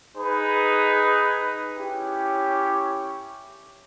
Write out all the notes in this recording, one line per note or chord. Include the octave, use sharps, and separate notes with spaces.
D#4 G#4 B4
C#4 E4 G4 C#5